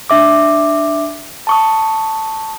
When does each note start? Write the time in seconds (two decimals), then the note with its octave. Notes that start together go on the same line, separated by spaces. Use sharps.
0.10 D4 E5 D6
1.47 A5 C#6 D#6